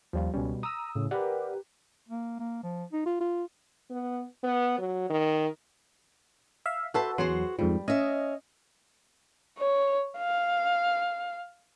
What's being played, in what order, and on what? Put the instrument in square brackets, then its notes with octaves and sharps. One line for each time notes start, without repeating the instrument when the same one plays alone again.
[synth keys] D#2 [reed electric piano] F3 G3 F4
[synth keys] C#2 C#4 [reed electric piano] B2 G3
[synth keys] A#5 D#7 [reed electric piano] D#6 E6
[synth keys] A2 C#3
[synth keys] G4 A#4 B4 [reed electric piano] D5 F#5
[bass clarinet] A#3
A#3
F3
D#4
F4
F4
[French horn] B3
B3
F#3
D#3
[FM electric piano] E5 F5
[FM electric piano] F#4 A4 E5 [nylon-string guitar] B4 C5 A5
[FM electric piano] E2 F#3 C6 [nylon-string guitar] F#4 G#4 C5
[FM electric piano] F2 G#2 F3 [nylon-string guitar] G3
[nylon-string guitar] C#4 E5 [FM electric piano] D#5
[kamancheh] C#5
F5